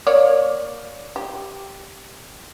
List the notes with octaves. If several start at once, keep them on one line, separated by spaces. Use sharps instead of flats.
A#3 C#5 D5
G4